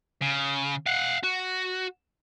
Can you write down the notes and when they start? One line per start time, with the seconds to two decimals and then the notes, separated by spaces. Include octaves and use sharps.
0.22 C#3
0.86 F5 F#5
1.24 F#4